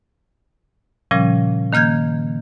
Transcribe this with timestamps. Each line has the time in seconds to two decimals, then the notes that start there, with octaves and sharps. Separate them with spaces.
1.11 A#2 C#3 F3 G3 C#4
1.73 D#3 A#3 F6 G6 G#6